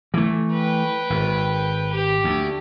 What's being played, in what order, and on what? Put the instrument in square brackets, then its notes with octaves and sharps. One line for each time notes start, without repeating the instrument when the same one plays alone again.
[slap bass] E3 A3
[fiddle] B4 G5
[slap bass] G#1
[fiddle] G4
[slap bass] D2